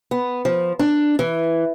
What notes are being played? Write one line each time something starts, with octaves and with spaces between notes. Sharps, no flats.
B3
F3
D4
E3